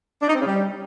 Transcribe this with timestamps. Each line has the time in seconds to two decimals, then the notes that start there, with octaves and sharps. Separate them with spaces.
0.22 D4
0.28 D#4
0.34 C4
0.40 C#3
0.46 G3